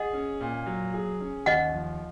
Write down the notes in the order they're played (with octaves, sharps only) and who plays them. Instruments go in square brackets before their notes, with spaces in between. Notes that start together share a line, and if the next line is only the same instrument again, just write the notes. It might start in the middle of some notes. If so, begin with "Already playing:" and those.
Already playing: [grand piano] G#4 [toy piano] D#5 F#5
[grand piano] C#4
A#2
F#3
G#4
C#4
[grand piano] D#2 [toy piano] D#5 F#5
[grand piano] F3